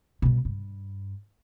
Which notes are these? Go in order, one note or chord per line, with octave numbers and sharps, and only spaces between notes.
B2 G3
G2